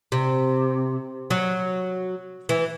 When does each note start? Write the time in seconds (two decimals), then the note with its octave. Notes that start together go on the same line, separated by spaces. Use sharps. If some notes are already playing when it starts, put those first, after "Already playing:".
0.12 C3
1.30 F#3
2.49 E3